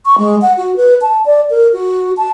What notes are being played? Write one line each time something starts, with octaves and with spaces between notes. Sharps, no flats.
C#6
G#3
F#5
F#4
B4
A5
D5
A#4
F#4
A5